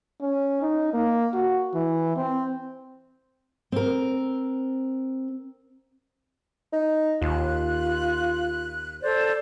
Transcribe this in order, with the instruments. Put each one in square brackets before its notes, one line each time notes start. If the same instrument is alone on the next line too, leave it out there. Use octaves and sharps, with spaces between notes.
[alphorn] C#4
D#4
A#3
F#4
E3
C4
[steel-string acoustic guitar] C4 A#4
[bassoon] D#4
[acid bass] D#2 [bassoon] F4 [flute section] F#6
[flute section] A4 C5 D5